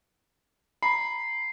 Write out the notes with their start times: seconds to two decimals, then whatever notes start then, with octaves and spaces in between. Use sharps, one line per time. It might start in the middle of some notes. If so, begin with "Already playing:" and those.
0.82 A#5 B5 C7